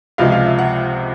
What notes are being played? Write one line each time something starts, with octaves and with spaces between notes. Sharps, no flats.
C#2 C3 F3 G#3 F5
F5
E5
F#5